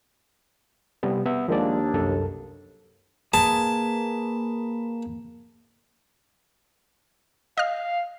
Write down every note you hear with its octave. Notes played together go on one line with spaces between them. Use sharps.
C3 G3 B3
B3 E5 E6
D#2 F3 G#3 A#3 D4 D5
C2 F#2 A4
A#3 G#4 B4 A5
D#5 F5 F6